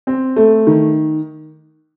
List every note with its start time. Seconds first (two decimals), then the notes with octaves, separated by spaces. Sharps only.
0.07 C4
0.36 A3
0.67 D#3